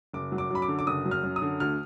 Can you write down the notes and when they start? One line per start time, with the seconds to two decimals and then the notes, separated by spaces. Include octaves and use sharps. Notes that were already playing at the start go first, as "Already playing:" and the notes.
0.13 F#1 D6
0.32 F#3
0.38 D6
0.51 F#2 B5
0.62 D6
0.68 D3
0.79 D6
0.87 F#1 D#6
1.05 F#3
1.11 F6
1.23 F#2
1.36 D#6
1.42 D3
1.60 D2 F6